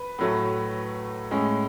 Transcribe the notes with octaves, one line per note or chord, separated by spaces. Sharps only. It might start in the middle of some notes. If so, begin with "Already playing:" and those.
Already playing: B4
A2 F#3 A3
A2 G#3 C#4